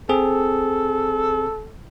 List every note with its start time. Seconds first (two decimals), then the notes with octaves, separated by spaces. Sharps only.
0.09 C4 G#4 A4